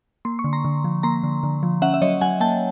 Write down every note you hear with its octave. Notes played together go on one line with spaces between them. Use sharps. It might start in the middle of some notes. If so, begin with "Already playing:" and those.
A#3 C6
C#6
D3
A#5 C6
D3
F3
A#3 A#5 C6
D3
D3
F3
C#4 E5 F#5
E5
F#3 C#5 D#5
F#3 F#5 G#5
A#3 G5 A5